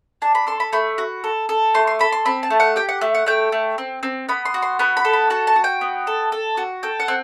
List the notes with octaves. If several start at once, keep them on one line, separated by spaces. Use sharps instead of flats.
D4 A5
B5
A4 C6
B5
A3 B5
F#4
A4
A4
A3 C6
C6
A4 B5
C6
C4 B5
A5
A3
F#5
G4 G5
F#5
A3 E5
F#5
A3 G5
A3
C4
C4
B3 B5
C6
F#4
C6
B3 B5
B5
A4
B5
F#4 A5
A5
F#4
G5
B3
A4
A4
F#4
A4 G5
F#5
C4